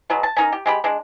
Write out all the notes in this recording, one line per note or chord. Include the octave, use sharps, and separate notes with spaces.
B2 F#3 G#3
A5
C#4 D#4 A#4
G4
G#3 G4 B5
G#3 D4